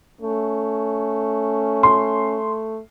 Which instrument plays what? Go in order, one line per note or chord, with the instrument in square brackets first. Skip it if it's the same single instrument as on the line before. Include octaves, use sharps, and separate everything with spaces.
[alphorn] A3 [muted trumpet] C#4
[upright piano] C6